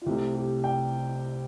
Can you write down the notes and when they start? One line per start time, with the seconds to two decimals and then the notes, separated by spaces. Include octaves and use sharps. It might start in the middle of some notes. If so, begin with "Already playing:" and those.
0.02 F4
0.06 C2 C3 A3 G4
0.34 G4
0.64 G5